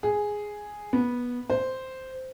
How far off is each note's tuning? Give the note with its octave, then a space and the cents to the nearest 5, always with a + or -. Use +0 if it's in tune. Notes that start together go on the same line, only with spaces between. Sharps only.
G#4 +0
B3 -15
C5 -5